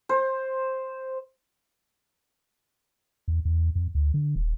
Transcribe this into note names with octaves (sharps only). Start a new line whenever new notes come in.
C5
E2
E2
F2
D2
D3
D#1